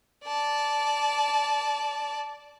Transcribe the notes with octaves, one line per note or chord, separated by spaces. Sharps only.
D5 A5